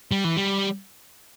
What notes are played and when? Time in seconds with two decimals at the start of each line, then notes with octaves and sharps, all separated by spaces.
0.11 G3
0.24 E3
0.37 G3